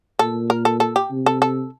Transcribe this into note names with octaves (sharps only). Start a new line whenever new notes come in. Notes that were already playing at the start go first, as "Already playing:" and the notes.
A#2 A4
A#4
A4
A4
G4
C3
A4
A4